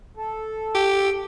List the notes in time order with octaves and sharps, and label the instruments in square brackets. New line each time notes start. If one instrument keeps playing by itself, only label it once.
[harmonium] A4
[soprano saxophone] G4